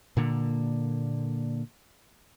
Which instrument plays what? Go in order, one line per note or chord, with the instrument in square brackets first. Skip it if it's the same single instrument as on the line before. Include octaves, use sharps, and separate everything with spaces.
[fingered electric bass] A#2 D3 A#3